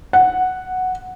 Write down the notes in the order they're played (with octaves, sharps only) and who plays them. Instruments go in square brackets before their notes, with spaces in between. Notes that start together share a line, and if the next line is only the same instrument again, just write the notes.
[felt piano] F#5